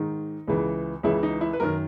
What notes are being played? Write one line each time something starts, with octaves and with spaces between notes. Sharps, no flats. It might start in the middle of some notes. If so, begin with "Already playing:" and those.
Already playing: G#2 D#3 D#4
C#2 C#3 E3
C#2 C#3 E3 E4
D#4
E4
B4
F#2 D#3 A#4